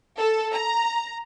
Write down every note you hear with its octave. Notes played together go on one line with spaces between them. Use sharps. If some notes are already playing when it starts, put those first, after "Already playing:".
A4
A#5